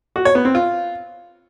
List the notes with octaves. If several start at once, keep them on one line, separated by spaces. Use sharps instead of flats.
F#4
C#5
B3
C4
F4